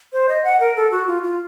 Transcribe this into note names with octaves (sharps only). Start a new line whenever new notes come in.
C5
D#5
F#5
A#4
A4
F#4
F4
F4